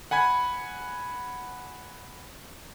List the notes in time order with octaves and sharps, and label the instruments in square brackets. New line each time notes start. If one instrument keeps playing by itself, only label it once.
[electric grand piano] F#5 G#5 B5 G#6